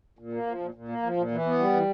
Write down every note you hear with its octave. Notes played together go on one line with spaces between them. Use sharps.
A#2
A#3
F3
A#2
A#2
A#3
F3
A#2
E3
B3
G3
E3